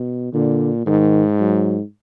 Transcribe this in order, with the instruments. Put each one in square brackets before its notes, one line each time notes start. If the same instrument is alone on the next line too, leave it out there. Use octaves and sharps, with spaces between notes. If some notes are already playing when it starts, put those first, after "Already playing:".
Already playing: [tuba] B2
[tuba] A#2 [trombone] D3
[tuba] G#2 [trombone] D#3
[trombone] F#3